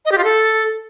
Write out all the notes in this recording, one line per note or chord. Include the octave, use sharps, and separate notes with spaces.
D#5
G4
F4
A4